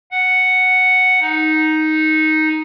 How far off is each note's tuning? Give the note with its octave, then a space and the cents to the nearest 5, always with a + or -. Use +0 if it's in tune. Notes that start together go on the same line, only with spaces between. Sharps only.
F#5 +0
D#4 +5